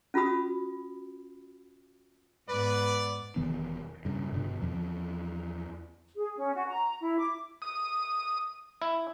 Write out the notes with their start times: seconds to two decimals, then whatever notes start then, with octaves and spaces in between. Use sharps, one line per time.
0.14 C#4 F4 F#4 B5 D#6
2.49 G#2 B3 B4 D5
3.36 E1 D#3 E3 B3
4.05 G2 C#3
4.32 G2 B2 D3
4.62 E2 F3
6.14 G#4
6.36 C#4
6.54 F#4
6.67 A#5
7.01 E4
7.18 D6
7.62 D#6
8.82 E4